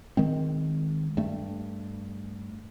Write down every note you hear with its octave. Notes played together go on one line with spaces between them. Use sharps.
D#3 G#3 C4
G2 A3